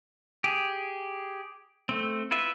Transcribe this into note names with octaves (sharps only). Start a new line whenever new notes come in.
G4 G#4
A3 C4
E4 F4 B4 E5